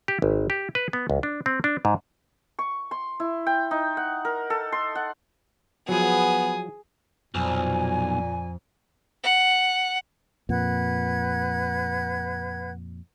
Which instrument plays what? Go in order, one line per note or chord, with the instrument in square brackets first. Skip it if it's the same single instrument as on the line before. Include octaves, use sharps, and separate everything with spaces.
[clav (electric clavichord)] G4
G#1
G4
B4
B3
C#2
D4
C4
D4
G#2
[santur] C#6
C6
E4
G5
D#4
F#5
A#4
A4
C6
F#5
[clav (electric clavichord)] F3 F#3 [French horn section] B3 [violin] G#4 [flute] G#5
[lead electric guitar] B1 [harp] F2 [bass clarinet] A#2 [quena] G#5
[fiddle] F#5
[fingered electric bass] F2 A#2 [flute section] B4 F#5 G#6